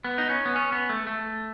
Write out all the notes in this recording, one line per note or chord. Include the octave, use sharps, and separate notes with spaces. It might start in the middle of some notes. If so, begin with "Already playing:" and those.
B3
D#4
C#4
B3
C#4
B3
A3
A3